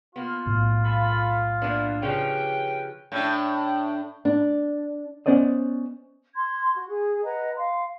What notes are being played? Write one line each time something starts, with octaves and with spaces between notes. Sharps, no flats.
A#3 B3 F4
B1 A2
A4 G#5 B5
A#3 B3 D4 E4
C#3 F3 G4 B4 C#5 G5
A2 D4
D4
B3 C#4 C5 D5 D#5
C6 G#6
F#4
G#4
B4 D#5 F#5 A#5
F5 C6